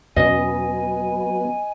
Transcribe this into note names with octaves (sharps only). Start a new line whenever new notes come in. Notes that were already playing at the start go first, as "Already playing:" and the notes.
E2 B2 F#3 B3 C#4 D#5 G#5